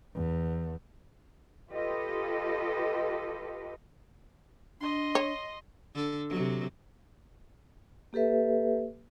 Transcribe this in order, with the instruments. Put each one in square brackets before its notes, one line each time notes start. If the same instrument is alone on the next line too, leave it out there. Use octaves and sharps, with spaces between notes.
[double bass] E2
[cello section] F4 G4 A4 B4 D#5
[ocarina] D4 [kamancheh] D#5 C6
[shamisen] C#5
[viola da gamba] D3 A4
C3 F#3
[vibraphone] A#3 G4 A4 B4 E5